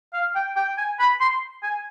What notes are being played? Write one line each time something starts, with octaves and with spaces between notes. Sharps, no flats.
F5
G5
G5
G#5
B5
C6
G#5